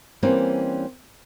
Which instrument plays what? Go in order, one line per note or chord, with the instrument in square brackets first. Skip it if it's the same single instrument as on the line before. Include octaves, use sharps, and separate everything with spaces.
[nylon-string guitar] E3 G3 A#3 C4 C#4